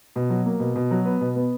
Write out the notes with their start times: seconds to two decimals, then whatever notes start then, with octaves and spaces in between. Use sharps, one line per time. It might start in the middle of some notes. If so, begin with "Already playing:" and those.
0.16 B2
0.30 F#3
0.46 A#3
0.60 B2
0.75 B2
0.91 F#3
1.05 B3
1.21 B2
1.36 B3